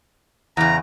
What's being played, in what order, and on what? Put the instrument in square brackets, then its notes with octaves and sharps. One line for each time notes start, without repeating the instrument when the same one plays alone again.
[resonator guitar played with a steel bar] E2 C#3 [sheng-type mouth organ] A#5